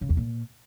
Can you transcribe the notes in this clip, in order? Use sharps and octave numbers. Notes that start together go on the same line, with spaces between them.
C#3
E2
A#2